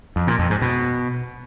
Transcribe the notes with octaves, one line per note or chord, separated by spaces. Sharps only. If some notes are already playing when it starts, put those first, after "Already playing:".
F2
A#2
F2
G#2
B2